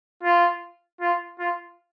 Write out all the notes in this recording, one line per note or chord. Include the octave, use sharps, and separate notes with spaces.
F4
F4
F4